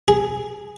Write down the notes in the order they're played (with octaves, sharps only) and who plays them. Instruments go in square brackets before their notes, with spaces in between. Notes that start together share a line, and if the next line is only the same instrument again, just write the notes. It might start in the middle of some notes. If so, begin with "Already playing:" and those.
[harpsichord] G#4